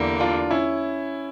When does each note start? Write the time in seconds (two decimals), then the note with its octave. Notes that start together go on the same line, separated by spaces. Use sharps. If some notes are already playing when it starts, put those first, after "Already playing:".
Already playing: E2 D3 G3 A#3
0.20 D4 F4
0.51 C#4 E4